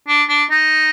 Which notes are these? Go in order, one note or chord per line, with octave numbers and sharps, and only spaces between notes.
D4
D4
D#4